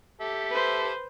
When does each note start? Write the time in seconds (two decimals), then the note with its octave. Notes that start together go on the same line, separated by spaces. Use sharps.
0.21 G4 A4 E5
0.50 B4 C5